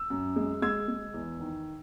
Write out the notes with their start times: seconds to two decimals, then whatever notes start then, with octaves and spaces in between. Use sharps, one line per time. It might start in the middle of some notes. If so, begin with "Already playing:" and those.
Already playing: E6
0.10 F#2
0.36 G#3
0.62 G#3 E6 G#6
0.88 G#3
1.14 E2
1.40 D#3